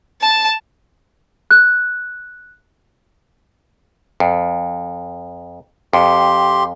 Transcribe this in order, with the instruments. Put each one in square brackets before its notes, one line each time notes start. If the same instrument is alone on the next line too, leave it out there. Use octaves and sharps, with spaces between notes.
[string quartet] A5
[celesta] F#6
[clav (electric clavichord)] F2
[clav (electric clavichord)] F2 [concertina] G4 C6